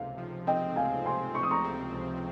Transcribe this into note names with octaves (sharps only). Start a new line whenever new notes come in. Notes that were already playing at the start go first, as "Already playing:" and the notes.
Already playing: C#2 C3 F5
F3
C4 D#5 G5
C#2 F5 G#5
C3 G#5 C6
F3 C#6
D#6
A#5 C#6
C4
C#2